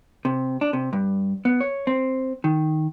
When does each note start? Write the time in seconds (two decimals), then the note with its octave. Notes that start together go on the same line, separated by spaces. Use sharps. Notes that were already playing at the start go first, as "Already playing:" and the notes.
0.25 C3
0.61 D4
0.73 C3
0.93 G2
1.45 B3
1.61 C#5
1.87 C4
2.44 D#3